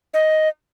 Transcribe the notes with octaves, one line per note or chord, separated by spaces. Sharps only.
D#5